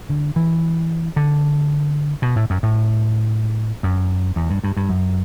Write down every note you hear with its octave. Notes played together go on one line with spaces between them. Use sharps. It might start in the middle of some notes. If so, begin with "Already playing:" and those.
D3
E3
D3
B2
A2
F#2
A2
F#2
E2
G2
G2
G2
F#2